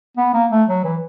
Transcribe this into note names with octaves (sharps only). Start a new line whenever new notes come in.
B3
A#3
A3
F#3
E3